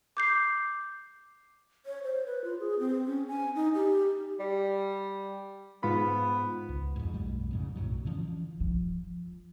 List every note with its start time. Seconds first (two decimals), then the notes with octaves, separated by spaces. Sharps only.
0.17 D6 G6 C7
1.86 C#5
2.03 C5
2.26 B4
2.44 F4
2.60 G#4
2.79 C4
3.06 C#4
3.28 G#5
3.55 D#4
3.75 G4
4.40 G3
5.83 G#2 B3 F4 B5
6.69 C#2
6.96 F2 G#2
7.13 B1 F2 G3 A3
7.51 F2 G#2 C#3
7.76 B1 F#2 A2 F#3
8.05 D3 E3 F3 C#4
8.60 F3